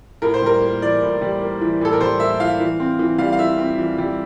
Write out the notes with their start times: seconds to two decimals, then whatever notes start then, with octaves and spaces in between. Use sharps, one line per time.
0.22 A2 A#4
0.34 C5
0.42 G3 A#4
0.61 A#3
0.82 E3 D5
1.02 A2
1.21 G3
1.41 A#3
1.61 E3
1.81 A2 A4
1.93 A#4
2.01 G3 C5
2.20 A#3 E5
2.40 E3 F5
2.60 E3
2.80 C4
2.99 E3
3.18 G3 F5
3.32 F5
3.39 E3 E5
3.58 C4
3.78 E3
3.98 G3